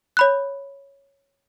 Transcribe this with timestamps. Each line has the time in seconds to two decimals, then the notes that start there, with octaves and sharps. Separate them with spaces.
0.17 C#5 B5 F#6